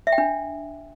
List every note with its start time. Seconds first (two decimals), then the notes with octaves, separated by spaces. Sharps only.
0.07 E5
0.12 G5
0.18 D4